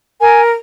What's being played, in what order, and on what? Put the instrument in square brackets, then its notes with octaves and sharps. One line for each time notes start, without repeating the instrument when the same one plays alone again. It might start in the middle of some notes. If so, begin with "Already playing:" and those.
[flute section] A#4 [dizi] G#5